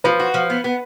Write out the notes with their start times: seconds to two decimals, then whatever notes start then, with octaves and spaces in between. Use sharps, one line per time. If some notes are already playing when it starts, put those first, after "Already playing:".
0.04 F3 B4
0.20 F#4
0.34 F3
0.50 B3
0.64 B3